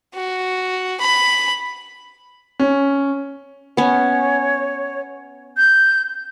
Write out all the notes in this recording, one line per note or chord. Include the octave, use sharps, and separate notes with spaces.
F#4
B5
C#4
B3 C#4 C#5
G6